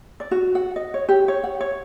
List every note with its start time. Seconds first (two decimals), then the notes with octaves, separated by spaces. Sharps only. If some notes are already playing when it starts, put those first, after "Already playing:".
0.20 D5
0.31 F#4
0.55 F#5
0.76 D#5
0.94 C#5
1.09 G4
1.28 C#5
1.44 F#5
1.61 C#5